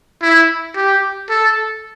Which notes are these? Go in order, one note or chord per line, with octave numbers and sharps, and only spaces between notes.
E4
G4
A4